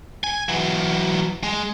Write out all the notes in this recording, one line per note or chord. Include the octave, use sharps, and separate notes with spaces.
G#5
E3 F#3
G#3